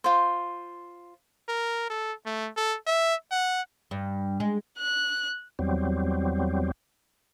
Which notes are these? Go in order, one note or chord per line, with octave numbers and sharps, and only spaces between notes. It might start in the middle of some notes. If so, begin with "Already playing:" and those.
F4 C5
A#4
A4
A3
A4
E5
F#5
G2
G#3
F#6
E2 F#3 G3 C4